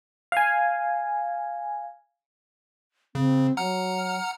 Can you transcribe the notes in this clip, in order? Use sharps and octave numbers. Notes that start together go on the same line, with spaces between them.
F5 G#5
C#3 C4
F#3 F#5 A#5 F6